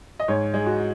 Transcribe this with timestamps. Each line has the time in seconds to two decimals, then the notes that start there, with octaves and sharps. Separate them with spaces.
0.20 D#5
0.28 G#2 C#5
0.54 G#3
0.66 F#4